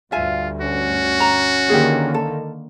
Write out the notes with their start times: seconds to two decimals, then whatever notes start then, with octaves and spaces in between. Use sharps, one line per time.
0.12 D2 G2 F4 E5 F5 G#5
0.61 C#4 F#4
1.20 A#5
1.69 D3 D#3 A#3 G4 G#4
2.14 A4